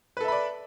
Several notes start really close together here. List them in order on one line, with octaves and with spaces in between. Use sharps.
B4 A4 E5 B5 D5